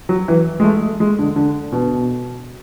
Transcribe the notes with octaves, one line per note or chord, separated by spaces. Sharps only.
F#3
E3
G#3
A3
G#3
D3
D3
B2